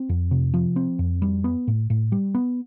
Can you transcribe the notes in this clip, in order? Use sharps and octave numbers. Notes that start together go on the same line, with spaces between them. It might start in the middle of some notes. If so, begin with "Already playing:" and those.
Already playing: C4
F2
C3
F3
C4
F2
G3
B3
A2
A2
G3
B3